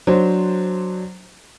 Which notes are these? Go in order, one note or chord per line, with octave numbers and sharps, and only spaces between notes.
F#3 D4 C5